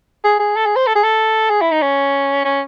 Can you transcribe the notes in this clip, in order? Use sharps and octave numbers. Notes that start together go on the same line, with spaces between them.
G#4
G#4
A4
G#4
C5
A4
G#4
A4
G#4
E4
D#4
C#4
C#4